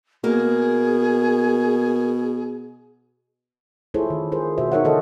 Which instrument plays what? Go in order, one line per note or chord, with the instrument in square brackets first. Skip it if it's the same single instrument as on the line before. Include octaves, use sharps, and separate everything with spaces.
[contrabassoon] B2 [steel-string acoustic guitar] A#3 [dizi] G#4
[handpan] E4 F4 G#4 A4 C5 C#5
D#3
F4 G#4 A#4 C5
B2 D#3 F#4 C5 E5
D#4 A#4 C5 C#5 E5 F#5
D3 E3 A4 C5 D#5